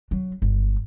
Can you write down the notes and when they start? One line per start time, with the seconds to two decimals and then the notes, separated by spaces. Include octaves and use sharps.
0.11 F#3
0.42 G1